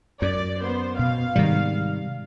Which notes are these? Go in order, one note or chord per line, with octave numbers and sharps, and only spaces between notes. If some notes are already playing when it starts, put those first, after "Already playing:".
F#2 D5
B3 C5
B2 F5
G#2 C3 D#3 G3